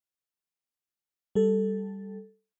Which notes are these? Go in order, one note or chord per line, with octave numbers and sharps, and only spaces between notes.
G3 A4